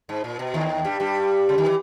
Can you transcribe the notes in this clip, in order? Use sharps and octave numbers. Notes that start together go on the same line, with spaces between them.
G#2
A#2
B2
D#2 D#3
G2 G3
G2 G3
C#3
D#3
E3